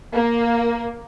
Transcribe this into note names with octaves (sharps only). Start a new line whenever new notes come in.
A#3